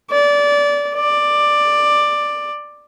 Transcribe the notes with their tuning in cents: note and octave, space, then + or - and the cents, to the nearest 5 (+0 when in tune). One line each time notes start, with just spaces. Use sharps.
D5 -20
D5 +10